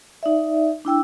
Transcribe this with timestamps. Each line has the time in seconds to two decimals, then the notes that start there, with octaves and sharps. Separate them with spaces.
0.23 D#4 D5 E5
0.85 D4 E4 G5 E6